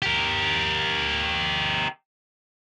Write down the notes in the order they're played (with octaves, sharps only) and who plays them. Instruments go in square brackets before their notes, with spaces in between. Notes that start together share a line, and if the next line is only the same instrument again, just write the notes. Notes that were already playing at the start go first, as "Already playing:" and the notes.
[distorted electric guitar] G4 A#4